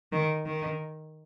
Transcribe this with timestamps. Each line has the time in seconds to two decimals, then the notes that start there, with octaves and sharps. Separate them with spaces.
0.12 D#3
0.46 D#3